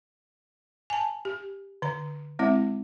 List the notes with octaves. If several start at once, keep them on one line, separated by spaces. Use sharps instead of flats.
G#5 A5
G4
D3 A#5
G#3 C4 E4 E5